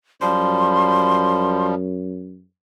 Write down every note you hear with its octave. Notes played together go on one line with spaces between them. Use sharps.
F#2 F3 G3 C6